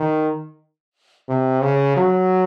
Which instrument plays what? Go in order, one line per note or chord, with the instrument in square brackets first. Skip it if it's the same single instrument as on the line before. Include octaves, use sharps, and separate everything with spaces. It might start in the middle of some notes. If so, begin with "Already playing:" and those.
Already playing: [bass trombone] D#3
C3
C#3
F#3